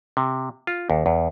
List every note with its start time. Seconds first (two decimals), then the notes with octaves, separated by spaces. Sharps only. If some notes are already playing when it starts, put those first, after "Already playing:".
0.17 C3
0.67 F4
0.90 D#2
1.06 E2